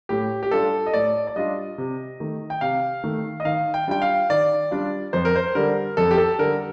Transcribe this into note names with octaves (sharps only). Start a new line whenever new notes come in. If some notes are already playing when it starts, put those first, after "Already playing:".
A2 G4
G4
G3 D4 F4 A4
D#5
A2 D5
D5
G3 D4 F4 D#5
C3
D#3 A3
G5
C3 F5
D#3 A3
D#5
D#3 F5
G5
G3 D4 F4 G5
F5
D#3 D5
G3 D4 F4
F2 C5
A#4
C5
D3 G3 A#4
F2 A4
G4
A4
D3 G3 A#4